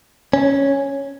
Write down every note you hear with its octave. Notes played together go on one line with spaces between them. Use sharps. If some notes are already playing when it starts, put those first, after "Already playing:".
C#4